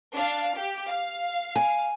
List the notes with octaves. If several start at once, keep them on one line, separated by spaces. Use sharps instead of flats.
D4 F5
G4
F5
G#5